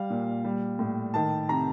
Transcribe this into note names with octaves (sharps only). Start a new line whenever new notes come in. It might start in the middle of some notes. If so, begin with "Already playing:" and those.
Already playing: G3 F5
A#2
G3
A2
D#3 A5
C3 A#5